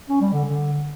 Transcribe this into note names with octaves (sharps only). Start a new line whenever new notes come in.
C#4
G3
D3
D3